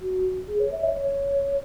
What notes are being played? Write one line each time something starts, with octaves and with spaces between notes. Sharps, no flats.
F#4
G#4
C#5
E5
C#5
C#5